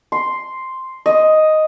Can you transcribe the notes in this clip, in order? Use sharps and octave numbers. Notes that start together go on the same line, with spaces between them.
C6
D#5